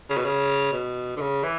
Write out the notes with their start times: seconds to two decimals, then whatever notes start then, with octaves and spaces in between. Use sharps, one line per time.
0.10 C#3
0.17 B2
0.25 C#3
0.72 B2
1.17 D3
1.21 C#3
1.43 E3